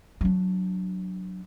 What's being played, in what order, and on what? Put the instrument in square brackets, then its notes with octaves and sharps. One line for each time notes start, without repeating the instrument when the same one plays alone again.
[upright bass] F#3 D4